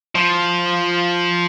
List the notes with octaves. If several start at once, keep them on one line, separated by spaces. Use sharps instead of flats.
F3